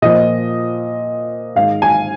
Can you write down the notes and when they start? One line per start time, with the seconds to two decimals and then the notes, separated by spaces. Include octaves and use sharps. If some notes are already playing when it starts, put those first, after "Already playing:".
0.02 A#2 F3 D#5
1.55 G#2 D#3 F5
1.82 G#5